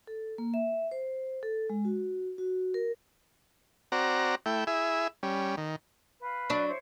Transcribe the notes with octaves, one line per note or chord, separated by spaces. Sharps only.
A4
A#3
E5
C5
A4
G#3
F#4
F#4
A#4
C4 F#4 D5 A#5
A3 E4 G5
E4 G#4 E5
G3 C#4
D#3
B4 F5
F#3 D4
E4 C5 C#5